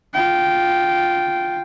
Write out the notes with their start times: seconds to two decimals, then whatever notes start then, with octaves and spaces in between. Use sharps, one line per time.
0.14 F4 G5